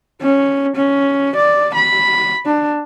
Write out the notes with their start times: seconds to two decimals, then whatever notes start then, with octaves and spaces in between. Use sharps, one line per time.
0.22 C#4
0.76 C#4
1.36 D5
1.74 B5
2.46 D4